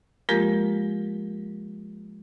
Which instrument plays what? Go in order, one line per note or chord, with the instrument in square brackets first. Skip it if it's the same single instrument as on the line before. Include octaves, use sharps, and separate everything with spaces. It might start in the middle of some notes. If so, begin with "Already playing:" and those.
[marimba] F3 G#3 A#3 F4 G4 A#4